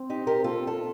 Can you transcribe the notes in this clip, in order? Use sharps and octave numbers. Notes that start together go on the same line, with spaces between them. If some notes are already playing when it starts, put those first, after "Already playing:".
Already playing: C4
D#4 G4
G4 A#4
F4 A4
F4 A4